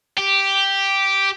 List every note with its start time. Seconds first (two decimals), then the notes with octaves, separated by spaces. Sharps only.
0.18 G4